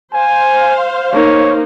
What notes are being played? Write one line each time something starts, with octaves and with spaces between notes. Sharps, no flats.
C5 F5 G#5
A#3 D#4 C#5